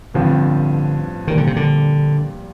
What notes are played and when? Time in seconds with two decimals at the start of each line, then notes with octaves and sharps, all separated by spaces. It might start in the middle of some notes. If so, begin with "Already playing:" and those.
0.14 A1 G2 D3 F3 C4
1.28 A#1 A#2 D#3 G3
1.38 D3
1.47 C3
1.56 D3